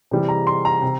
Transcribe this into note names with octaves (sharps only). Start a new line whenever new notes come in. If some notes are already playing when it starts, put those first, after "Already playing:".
C3 E3 G3
A#5
C6
A#5
C3